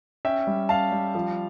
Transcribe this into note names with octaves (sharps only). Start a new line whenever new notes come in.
C#4 E5 G5
G3
C#4 F5 A5
G3
F3